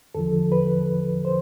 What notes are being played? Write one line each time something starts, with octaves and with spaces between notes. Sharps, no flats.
E2 D3 F3 A4
B4
C5